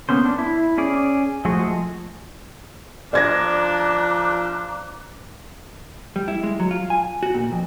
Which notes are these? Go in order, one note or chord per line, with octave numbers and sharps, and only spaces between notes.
A#3 B3 C#4 C5
D4
E4
C#4 G#4 D5
F3 G#3 A3 F#4 G#4
F3 D4 D5 A#5 D6 F#6 G#6 A#6
G3
E4
G#3
F#3
F4
G#5
F#4
A#2
F2